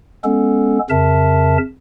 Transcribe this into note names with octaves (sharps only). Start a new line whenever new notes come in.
G#3 B3 C#4 A4
F2 C#3 A#4 E5 A5